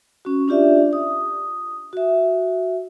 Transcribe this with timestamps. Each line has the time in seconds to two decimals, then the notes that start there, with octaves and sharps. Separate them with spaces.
0.25 C#4 F#4
0.48 D4 F4 G4 D5 E5
0.93 D#6
1.93 F#4 E5